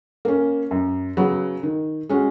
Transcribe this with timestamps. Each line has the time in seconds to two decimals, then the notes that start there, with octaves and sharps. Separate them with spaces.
0.25 A#3 C#4
0.71 F#2
1.17 C#3 F#3 B3
1.63 D#3
2.09 G#3 C#4 F#4